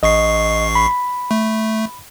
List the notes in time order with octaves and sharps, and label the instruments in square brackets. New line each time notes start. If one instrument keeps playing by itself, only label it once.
[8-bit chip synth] A1 C#6 C7 [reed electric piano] D#5
[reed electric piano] B5
[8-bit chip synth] A3